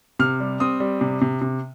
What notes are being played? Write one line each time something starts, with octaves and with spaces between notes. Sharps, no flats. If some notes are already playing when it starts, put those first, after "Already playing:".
C3 F6
G3
C4 D#6
G3
C3
C3
C3